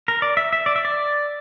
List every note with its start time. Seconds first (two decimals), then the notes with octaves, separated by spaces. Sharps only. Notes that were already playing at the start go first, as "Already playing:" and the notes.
0.08 A#4
0.22 D5
0.37 E5
0.53 E5
0.66 D5
0.76 E5
0.85 D5